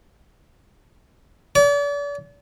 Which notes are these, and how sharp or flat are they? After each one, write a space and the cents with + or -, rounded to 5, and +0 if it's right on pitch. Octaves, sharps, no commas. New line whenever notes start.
D5 -40